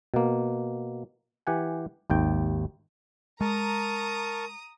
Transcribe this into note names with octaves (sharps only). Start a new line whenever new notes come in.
B2 A#3
E3 G4 F#5 G#5
G#1 D#2 G5
G#3 A#4 A5 A#5 C#6 D#6